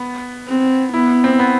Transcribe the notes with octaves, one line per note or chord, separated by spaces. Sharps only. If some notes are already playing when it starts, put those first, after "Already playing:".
Already playing: B3
C4
B3 E4
C4
B3